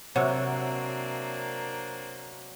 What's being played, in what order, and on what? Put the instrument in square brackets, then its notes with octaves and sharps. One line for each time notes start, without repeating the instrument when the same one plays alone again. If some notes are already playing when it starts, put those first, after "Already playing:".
[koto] C3 [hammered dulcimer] F#3 E5 [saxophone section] A#3 C4 D4 [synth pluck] C#5 F#5